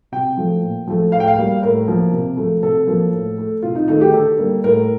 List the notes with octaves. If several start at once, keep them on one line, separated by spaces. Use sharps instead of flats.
C3 G5
F3 A3
A#2
F3 A3
A2 F5
G5
F5
G3 A#3
A2 A#4
F3 A#3
C3
F3 A3
C3 A4
F3 A#3
A2
A3
C3 F4
D#4
D#3 A3 D#4
G4
D3 A4
G3 A#3
A2 A#4